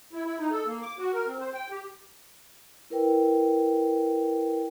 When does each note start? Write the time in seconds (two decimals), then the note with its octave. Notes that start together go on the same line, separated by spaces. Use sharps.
0.13 E4
0.26 E4
0.39 D#4
0.51 A4
0.66 A#3
0.82 D6
0.99 F#4
1.13 A#4
1.27 C4
1.40 C5
1.54 G5
1.71 G4
2.90 E4 A#4 B4 G5